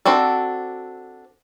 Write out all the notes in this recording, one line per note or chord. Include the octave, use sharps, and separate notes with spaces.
C4 D4 F#4 A4